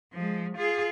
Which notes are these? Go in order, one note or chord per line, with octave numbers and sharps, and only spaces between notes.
F3 G#3
F4 G#4